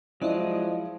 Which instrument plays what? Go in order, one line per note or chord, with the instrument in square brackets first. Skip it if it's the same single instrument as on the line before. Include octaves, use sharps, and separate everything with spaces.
[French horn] F3 [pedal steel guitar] F#3 G#3 [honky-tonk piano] E4 [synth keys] D5 D#5